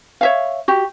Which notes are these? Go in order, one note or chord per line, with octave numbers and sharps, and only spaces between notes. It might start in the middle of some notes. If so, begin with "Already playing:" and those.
C#5 E5 F5
F#4 G4